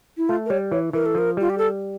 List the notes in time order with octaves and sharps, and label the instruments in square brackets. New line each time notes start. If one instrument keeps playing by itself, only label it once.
[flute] E4
[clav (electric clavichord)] A3 [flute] F4
[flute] A#4
[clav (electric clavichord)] G3 [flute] C#5
[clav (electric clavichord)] E3 [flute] C#5
[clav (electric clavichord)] E3 [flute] A#4
[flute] A4
[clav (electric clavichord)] F3 [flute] A#4
[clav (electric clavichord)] G3 [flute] F4
[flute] G4
A4